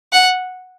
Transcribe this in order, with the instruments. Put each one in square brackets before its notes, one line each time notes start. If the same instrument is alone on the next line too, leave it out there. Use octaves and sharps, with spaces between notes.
[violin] F#5